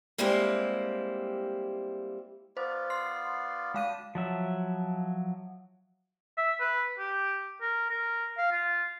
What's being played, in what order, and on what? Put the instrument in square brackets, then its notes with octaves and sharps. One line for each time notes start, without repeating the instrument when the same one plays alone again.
[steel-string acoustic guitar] G3 G#3 A#3 C4 E4 G4
[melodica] B3 F4 D5 [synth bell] C5
[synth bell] C6 C7
[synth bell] G#3 F5 D#7 [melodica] D4 G4 B5
[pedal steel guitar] F3 F#3 E5
[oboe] E5
B4
G4
A#4
A#4
F5
F4